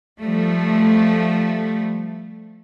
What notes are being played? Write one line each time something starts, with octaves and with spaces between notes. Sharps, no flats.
F3 G3 A3